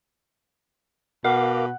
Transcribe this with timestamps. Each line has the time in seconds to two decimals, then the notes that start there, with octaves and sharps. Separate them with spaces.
1.24 B2 A#4 F5 F#5 D6